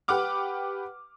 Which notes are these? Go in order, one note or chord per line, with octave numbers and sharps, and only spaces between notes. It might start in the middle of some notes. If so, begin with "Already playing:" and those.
G4 B4 F#5 D6 F6